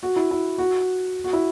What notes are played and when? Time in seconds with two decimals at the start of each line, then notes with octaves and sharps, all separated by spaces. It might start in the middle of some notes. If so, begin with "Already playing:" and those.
0.03 F#4
0.16 E4
0.31 E4
0.58 F#4
1.24 F#4
1.33 E4